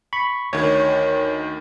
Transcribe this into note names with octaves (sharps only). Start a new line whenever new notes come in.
B5 C#6
D2 D#3 C#5